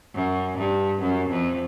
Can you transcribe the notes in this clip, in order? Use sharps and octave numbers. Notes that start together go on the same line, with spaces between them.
F#2
G2
F#2
F2